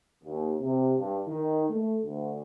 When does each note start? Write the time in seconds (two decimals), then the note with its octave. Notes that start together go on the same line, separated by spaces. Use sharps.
0.24 D#2
0.60 C3
0.98 G2
1.27 D#3
1.70 A3
2.04 D2